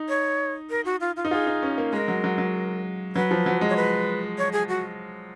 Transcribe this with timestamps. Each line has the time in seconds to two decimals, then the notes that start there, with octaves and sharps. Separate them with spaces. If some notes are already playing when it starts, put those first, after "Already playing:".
Already playing: D#4
0.09 C#5
0.70 A#4
0.85 F#4
1.01 F4
1.17 F4
1.25 D#4
1.31 F4 G#4
1.47 D#4
1.63 C#4
1.78 A#3
1.93 G#3 A#4
2.08 F#3
2.24 F#3
2.38 F#3
3.15 F#3 B4
3.31 F3
3.46 F#3
3.61 G#3
3.70 C#5
3.76 B4
4.38 C#5
4.53 G#4
4.69 F#4